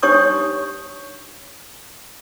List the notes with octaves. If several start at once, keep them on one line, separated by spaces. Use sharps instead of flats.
D4 D#4 G4 C#5 C#6 D#6